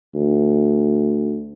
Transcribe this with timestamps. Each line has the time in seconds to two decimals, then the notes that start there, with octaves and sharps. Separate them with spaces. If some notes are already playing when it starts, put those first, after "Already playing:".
0.15 D2